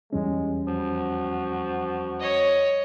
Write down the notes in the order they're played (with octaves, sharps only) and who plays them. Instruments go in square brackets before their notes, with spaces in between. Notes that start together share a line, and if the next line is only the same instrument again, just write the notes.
[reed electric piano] E2 G3 C#4 [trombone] G#3
[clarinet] F3 [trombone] F#4
[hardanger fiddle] C#5 D#5